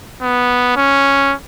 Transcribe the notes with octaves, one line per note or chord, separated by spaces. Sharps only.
B3
C#4